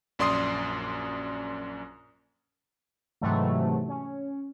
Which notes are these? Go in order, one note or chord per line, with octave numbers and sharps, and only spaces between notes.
A#1 F#2 D5 C6 D#6 C7
G#2 C3 E3 F#3 A3
C#4